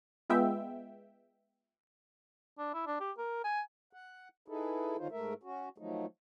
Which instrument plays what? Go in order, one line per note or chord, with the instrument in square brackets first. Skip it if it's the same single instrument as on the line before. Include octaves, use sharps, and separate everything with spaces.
[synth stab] G#3 B3 F4 E5 G5
[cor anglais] D4
E4
D4
G4
A#4
G#5
[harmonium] F#5
D#4 E4 G#4 A4 B4
D3 D#3 C#4 D#4 F4 C5
G#2 A3 A#4 E5
C#4 F#4
D#3 F3 F#3 A3 D#4